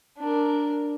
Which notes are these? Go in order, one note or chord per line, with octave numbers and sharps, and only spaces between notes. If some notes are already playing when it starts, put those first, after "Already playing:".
D4 A#4